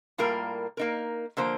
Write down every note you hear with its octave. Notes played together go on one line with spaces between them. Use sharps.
A2 G3 A#3 F4 A#4
A#3 D#4 A#4
D3 F3 A#3 F4 C5